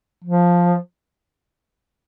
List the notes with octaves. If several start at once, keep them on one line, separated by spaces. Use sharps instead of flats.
F3